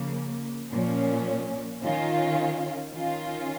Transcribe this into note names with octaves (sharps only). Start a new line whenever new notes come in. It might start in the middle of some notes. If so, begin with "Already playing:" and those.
Already playing: C#3 F3 A#3
A#2 F3 C#4
D#3 C#4 F4
D#3 C#4 F4